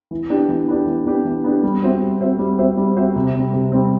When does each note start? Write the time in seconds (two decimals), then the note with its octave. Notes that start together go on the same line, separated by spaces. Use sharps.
0.11 E3
0.30 B3 D4 G4
0.49 E3
0.68 B3 D4 G4
0.87 E3
1.06 B3 D4 G4
1.25 E3
1.44 B3 D4 G4
1.63 G3
1.82 C4 F#4 C5 E5
2.01 G3
2.20 C4 F#4 C5 E5
2.39 G3
2.58 C4 F#4 C5 E5
2.77 G3
2.96 C4 F#4 C5 E5
3.16 C3
3.35 G3 C4
3.53 C3
3.72 G3 C4